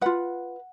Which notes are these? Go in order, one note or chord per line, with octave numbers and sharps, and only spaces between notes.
F4 B4 F#5